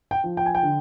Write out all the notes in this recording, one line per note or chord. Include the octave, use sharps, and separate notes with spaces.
G5
F3
G5
G#5
G5
D3